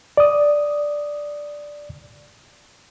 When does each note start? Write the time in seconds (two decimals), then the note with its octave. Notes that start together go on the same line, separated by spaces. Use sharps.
0.17 D5 D#6